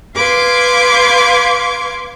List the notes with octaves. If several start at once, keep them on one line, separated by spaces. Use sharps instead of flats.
B4 F5 C6 D6 G#6